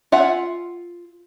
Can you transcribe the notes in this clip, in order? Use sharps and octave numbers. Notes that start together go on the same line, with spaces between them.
F4 E5 F#5 G#5